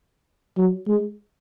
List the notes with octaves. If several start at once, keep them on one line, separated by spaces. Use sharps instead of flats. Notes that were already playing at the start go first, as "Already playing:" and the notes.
F#3
G#3